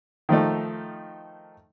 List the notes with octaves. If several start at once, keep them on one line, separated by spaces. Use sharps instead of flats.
D#3 F3 A3 D#4